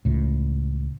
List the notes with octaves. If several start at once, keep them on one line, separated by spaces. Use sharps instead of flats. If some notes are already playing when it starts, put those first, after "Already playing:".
C#2 A2